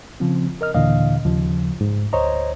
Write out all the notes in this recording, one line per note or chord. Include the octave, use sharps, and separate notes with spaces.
C#3 F3 C4
A#4 D#5 F6
D#2 A#2 D3 E3 D#5 F5
D#2 C#3 F3
G#2
D2 C5 C#5 D#5 A#5